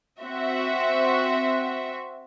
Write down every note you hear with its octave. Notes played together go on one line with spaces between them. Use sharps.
C4 F#4 E5